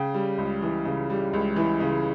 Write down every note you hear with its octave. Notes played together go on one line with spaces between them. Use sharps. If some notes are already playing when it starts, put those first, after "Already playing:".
Already playing: C#3 G5
G3
C#2
E3
C#3
G3
C#2
E3
C#3